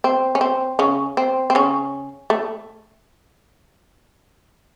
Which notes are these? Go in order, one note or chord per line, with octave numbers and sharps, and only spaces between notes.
C4
C#4
C4
C#3 C#4
C4
C4
C#3 C#4
A3